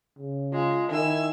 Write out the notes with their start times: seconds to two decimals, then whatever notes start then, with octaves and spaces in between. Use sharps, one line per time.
0.18 C#3
0.53 G#3 F4
0.91 D#3 E4 G#5 E6